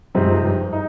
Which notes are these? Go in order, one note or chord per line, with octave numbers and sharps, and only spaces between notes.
F#2 C3 F3 G#3 C4 D#4
G2
D#4